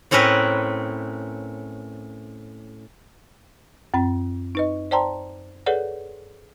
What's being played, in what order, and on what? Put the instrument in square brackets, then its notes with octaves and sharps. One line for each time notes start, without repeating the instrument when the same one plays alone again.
[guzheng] A2 C4 C#4 A#4 B4
[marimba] F#2 C4 B5
D#4 B4 D#5
C5 D5 G5 A5 A#5 C6
G#4 A4 B4 C#5 D5 F#5